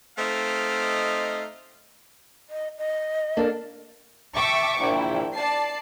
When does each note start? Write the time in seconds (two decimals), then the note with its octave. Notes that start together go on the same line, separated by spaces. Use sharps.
0.18 A3 C4 D#4 D#5 F5
2.50 D#5
2.78 D#5
3.37 A#3 D4 A4
4.35 E5 G5 A5 C#6 D6
4.80 A#1 E4 G5
5.36 D5 A5 C7